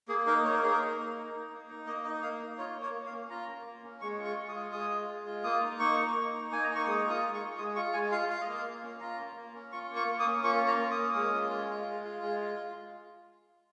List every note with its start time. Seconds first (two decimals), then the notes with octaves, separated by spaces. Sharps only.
0.08 A#3 G#4
0.26 D#4 A#4
0.44 A#3 C#5
0.54 A#4
0.63 D#4 G#4
0.72 A#4
0.80 A#3
0.98 D#4
1.15 A#3
1.34 D#4
1.51 A#3
1.69 D#4
1.87 A#3 D#5
2.04 D#4 D#5
2.23 A#3 F5
2.41 D#4
2.58 F4 C#5
2.76 A#3
2.82 C#5
2.94 A#3
3.07 F5
3.12 C#4
3.30 F4 A#5
3.48 A#3
3.65 A#3
3.83 C#4
4.01 G#3 C#6
4.19 F4
4.25 C#6
4.37 G#3
4.48 D#6
4.55 F4
4.72 G#3 D#6
4.90 F4
5.08 G#3
5.26 F4
5.44 A#3 D#6
5.62 D#4
5.79 A#3 C#6
5.98 D#4
6.15 A#3
6.33 D#4
6.51 A#3 G#5
6.64 A#5
6.69 D#4
6.75 C#6
6.86 G#3 D#6
7.05 F4
7.10 D#6
7.23 G#3
7.34 C#6
7.40 F4
7.58 G#3 D#6
7.76 F4 C#6
7.93 G#3 G#5
8.11 F4 F5
8.29 F4 F5
8.41 D#5
8.47 A#3
8.54 F5
8.65 A#3
8.83 C#4
9.01 F4 A#5
9.19 A#3
9.36 A#3
9.55 C#4
9.72 F4 C#6
9.90 A#3
9.96 C#6
10.08 A#3
10.20 D#6
10.26 C#4
10.43 F4 C#6
10.62 A#3
10.68 A#5
10.79 A#3
10.91 D#6
10.97 C#4
11.15 G#3
11.33 F4
11.50 G#3
11.69 F4
11.87 G#3
12.04 F4
12.22 G#3
12.40 F4